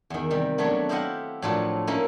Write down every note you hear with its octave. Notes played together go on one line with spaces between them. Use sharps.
E2 D#3
C3 D#3 G3
F#3 A3 B3 D4 C#5
E4 G4 C5 D#5 F5 F#5
A2 F3 F#3 D4 F4 A4
A#3 C#4 D#4 E4 A4